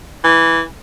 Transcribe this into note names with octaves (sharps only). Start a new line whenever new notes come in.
E3